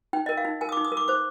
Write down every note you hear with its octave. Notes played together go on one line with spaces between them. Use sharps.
D#4 G5
A#4 D#5
F5
D#4
A#4 G#5
D#6
D#4 D6
D#6
A#4
D6
C5 D6